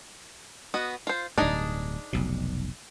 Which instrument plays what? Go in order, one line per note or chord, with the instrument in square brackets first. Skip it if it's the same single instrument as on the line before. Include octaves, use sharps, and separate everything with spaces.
[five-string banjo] B3 F#4 D#5
F4 C5
[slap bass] D1 G2 [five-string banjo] D4 D#4 G#4
[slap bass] F1 B1 B2